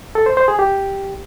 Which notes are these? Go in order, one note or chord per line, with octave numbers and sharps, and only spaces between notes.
A4
C5
C5
G#4
G4